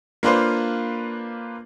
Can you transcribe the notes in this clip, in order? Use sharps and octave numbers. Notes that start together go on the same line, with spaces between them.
A#3 D4 F4 B4 C5